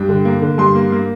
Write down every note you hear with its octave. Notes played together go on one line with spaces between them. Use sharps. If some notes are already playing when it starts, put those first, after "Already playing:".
Already playing: G2 G5
D3
A#3
D3
G2 C6
A#3
A#3